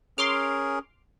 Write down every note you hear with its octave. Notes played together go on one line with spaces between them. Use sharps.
C#4 G#4 A#4 C6 D6 F6